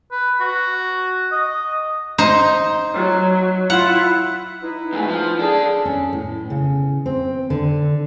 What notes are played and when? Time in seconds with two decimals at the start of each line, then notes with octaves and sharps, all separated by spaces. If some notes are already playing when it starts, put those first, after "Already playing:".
0.12 B4
0.40 F#4
1.32 D#5
2.18 D#4 C5
2.94 F#3
3.70 E4 F4 F#5
4.63 D#4 E4 B4
4.93 D2 G#2
5.08 F3
5.39 D4 G#4 A4
5.85 C#4
6.13 A2
6.50 C#3
7.06 C4
7.50 D3